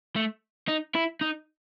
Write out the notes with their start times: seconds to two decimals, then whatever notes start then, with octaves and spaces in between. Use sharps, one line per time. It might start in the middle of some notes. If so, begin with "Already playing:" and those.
0.16 A3
0.68 D#4
0.95 E4
1.21 D#4